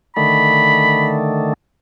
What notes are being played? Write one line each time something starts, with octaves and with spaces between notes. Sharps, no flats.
D3 D#3 A3 B5